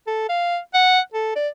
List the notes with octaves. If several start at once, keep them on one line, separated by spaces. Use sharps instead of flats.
A4
F5
F#5
A4
D5